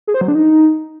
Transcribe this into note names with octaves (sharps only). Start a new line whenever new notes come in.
G#4
C5
F#3
D4
D#4